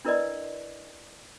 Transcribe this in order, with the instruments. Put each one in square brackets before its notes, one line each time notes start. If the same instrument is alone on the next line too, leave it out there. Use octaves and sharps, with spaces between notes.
[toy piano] D4 E4 A#4 B4 D5 D#5